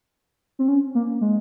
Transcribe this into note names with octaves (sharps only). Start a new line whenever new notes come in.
C4
C#4
A#3
G#3